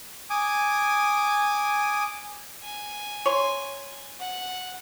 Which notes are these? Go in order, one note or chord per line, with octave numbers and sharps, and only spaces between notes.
G#5 D6 D#6
G#5
C#5 C6
F#5